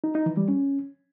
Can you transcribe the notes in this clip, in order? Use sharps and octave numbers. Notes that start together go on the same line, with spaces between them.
D#4
D#4
E3
G3
C#4